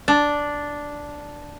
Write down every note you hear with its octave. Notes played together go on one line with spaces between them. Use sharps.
D4